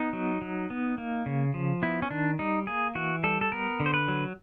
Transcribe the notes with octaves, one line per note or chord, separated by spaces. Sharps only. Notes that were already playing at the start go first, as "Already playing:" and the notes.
Already playing: B3 D#4
F#3
F#3
B3
A#3
C#3
F3
B3 E4
C#4
D#3 D4
G3 D#4
A#3 G#4
E3 F#4
G3 A4
A4
B3 A#4
D3
C5
B4
F#3